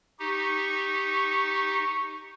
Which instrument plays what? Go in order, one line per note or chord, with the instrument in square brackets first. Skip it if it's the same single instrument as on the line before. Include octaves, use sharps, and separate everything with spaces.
[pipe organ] D#4 G4 [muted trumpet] C#6